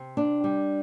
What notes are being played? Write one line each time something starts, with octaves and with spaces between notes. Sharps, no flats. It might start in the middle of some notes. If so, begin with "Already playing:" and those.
Already playing: C3
D4
G3